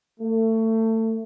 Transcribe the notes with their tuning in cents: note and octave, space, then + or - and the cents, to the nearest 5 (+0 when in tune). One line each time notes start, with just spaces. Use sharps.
A3 +25